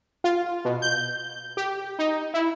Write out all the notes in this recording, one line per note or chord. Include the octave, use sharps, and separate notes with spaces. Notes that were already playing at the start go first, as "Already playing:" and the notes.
F4
B2
G6
G4
D#4
E4